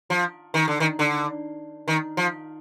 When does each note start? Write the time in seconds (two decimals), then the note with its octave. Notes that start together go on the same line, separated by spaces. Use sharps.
0.10 F3
0.54 D#3
0.68 D3
0.80 D#3
0.99 D3
1.88 D#3
2.17 F3